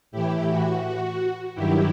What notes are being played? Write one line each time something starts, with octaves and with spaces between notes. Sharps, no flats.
A2 E3 E4 G4
F#4
F#4
G2 D#3 F#3 E4 G4